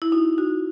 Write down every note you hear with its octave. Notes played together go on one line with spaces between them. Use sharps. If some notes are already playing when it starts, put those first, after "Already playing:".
E4
D#4 F#4
D#4 F#4